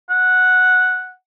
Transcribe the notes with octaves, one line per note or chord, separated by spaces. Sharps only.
F#5